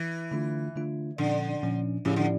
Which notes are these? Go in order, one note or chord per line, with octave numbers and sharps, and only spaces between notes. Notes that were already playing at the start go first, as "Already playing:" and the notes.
Already playing: E3
D3 A3 D4 F4
D3 A3 D4 F4
A#2 D3 F3 C#4
A#2 F3 C#4
A2 C#3 F3 C#4 E4 G4
D3